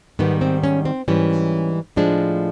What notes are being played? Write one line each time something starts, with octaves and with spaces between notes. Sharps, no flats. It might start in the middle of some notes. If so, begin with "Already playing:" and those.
G#2 D#3 G3 B3
C4
C#4
C4
G#2 E3 G3 C#4
A2 F3 G#3 D4